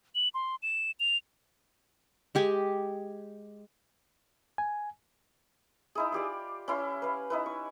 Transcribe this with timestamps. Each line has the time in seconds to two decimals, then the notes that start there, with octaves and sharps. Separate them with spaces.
0.15 F#7
0.34 C6
0.63 E7
1.00 F7
2.35 G#3 G4 G#5
4.58 G#5
5.95 D#4 E4 G#4
6.12 F4 G4 D5
6.68 C#4 E4 C6
7.02 B4 F5
7.30 D#4 E4 B4
7.46 C#6